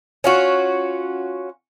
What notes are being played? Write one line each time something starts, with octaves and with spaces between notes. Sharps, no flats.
C#4 F4 F#4